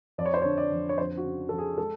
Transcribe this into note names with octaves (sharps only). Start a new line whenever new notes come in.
F2 D5
C#5
C5
C#5
D3
D5
F2
C#5
F2 C5
F#4
C#3
F2 A4
G#4
G#3 A4